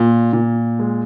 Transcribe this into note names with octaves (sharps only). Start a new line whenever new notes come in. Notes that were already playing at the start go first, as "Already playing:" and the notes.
Already playing: A#2
A#2
G#3